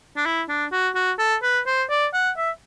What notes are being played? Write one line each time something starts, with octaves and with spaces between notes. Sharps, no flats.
D4
E4
D4
F#4
F#4
A4
B4
C5
D5
F#5
E5